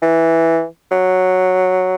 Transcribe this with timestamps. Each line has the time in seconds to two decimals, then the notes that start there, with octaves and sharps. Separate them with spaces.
0.02 E3
0.91 F#3